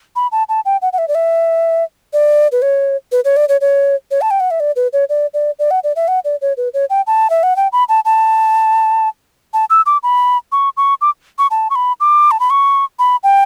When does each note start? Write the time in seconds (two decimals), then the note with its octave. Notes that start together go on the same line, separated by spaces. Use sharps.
0.16 B5
0.32 A5
0.49 A5
0.65 G5
0.82 F#5
0.93 F#5
0.98 E5
1.08 D5
1.15 E5
2.13 D5
2.52 B4
2.62 C#5
3.12 B4
3.25 C#5
3.37 D5
3.49 C#5
3.61 C#5
4.11 C#5
4.21 A5
4.31 G5
4.40 F#5
4.51 E5
4.60 D5
4.76 B4
4.93 C#5
5.09 D5
5.34 D5
5.59 D5
5.71 F#5
5.84 D5
5.96 E5
6.08 F#5
6.25 D5
6.42 C#5
6.57 B4
6.74 C#5
6.90 G5
7.07 A5
7.30 E5
7.43 F#5
7.56 G5
7.72 B5
7.89 A5
8.05 A5
9.54 A5
9.70 E6
9.86 D6
10.03 B5
10.52 C#6
10.77 C#6
11.01 D6
11.39 C#6
11.51 A5
11.70 C#6
11.75 B5
12.00 D6
12.31 A5
12.40 B5
12.50 C#6
12.99 B5
13.23 G5